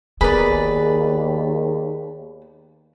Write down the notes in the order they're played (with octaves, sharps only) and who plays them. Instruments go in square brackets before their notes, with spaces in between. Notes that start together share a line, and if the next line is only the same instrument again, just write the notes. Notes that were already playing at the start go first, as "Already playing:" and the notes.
[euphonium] D#2 [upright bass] B3 [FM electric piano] G#4 A#4 [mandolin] B4 D5